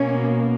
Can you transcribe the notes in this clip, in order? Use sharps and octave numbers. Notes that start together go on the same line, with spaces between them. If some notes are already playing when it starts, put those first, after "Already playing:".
Already playing: B2 A#3 C#4